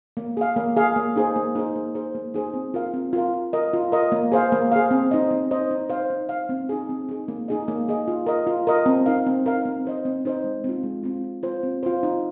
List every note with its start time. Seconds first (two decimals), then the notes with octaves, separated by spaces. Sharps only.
0.17 A#3
0.37 G#4 F5
0.56 A#3
0.76 G#4 F5
0.96 A#3
1.16 D#4 G#4 C5
1.36 A#3
1.55 D#4 G#4 C5
1.76 A#3
1.95 D#4 G#4 C5
2.15 A#3
2.34 D#4 G#4 C5
2.54 C4
2.74 F4 A#4 F5
2.94 C4
3.13 F4 A#4 F5
3.34 F4
3.53 A#4 D#5
3.73 F4
3.92 A#4 D#5
4.12 A#3
4.32 G#4 C5 F5
4.52 A#3
4.72 G#4 C5 F5
4.91 C4
5.11 D#4 C5 D#5
5.31 C4
5.51 D#4 C5 D#5
5.71 D#4
5.89 C5 F5
6.10 D#4
6.29 C5 F5
6.49 C4
6.69 D#4 G#4
6.89 C4
7.09 D#4 G#4
7.28 A#3
7.48 D#4 G#4 D#5
7.68 A#3
7.88 D#4 G#4 D#5
8.08 F4
8.27 A#4 D#5
8.47 F4
8.67 A#4 D#5
8.86 C4
9.06 D#4 A#4 F5
9.26 C4
9.46 D#4 A#4 F5
9.65 C4
9.85 D#4 C5 D#5
10.05 C4
10.25 D#4 C5 D#5
10.44 G#3
10.64 C4 F4
10.83 G#3
11.03 C4 F4
11.24 C4
11.43 F4 C5
11.63 C4
11.83 F4 C5
12.03 D#4